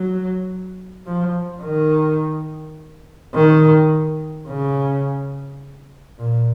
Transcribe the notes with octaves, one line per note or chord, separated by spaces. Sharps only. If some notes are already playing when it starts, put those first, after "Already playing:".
Already playing: F#3
F3
D#3
D#3
C#3
A#2